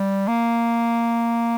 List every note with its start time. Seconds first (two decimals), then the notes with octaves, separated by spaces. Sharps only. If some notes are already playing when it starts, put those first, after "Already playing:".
Already playing: G3
0.28 A#3